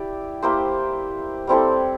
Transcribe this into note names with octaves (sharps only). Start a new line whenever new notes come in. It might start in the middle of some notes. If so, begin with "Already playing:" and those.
Already playing: E4 G4 D5
A#3 E4 G4 C5
G3 C4 E4 A4